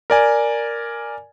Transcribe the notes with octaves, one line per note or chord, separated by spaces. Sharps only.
A#4 D5 G#5